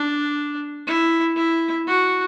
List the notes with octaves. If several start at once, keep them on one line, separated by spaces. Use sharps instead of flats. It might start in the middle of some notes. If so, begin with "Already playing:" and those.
Already playing: D4
E4
E4
F#4